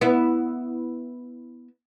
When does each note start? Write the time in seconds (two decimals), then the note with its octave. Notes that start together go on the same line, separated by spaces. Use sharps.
0.01 B3 E4